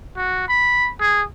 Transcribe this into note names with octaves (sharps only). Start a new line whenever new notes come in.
F#4
B5
G#4